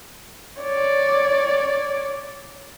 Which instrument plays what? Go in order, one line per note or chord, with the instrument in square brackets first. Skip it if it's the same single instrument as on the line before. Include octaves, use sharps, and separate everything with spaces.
[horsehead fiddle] C#5 D5